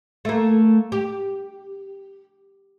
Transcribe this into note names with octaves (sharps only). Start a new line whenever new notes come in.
A3 A#3
G4